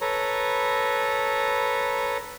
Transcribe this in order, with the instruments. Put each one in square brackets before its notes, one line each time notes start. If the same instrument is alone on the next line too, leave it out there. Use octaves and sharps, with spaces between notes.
[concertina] A4 B4 C#5 A#5